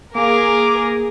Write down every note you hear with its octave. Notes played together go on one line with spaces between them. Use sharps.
A#3 G#4 A#4 D6